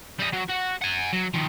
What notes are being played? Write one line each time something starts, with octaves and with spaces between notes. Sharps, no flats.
G3 D#5
F#3
F#4
F#5 G#5
F#3
D#3 F3